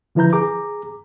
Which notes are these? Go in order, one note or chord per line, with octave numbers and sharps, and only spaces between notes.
D3 F3 E4 B4 A#5 G6
G#4 A#5 D6